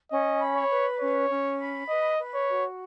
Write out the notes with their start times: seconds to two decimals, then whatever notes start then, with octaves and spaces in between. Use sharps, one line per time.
0.11 C#4 D#5
0.41 B5
0.55 C#5
0.70 B4
1.00 C#4 C#5
1.30 C#4
1.59 B5
1.89 B4 D#5
2.18 B4
2.34 C#5
2.49 F#4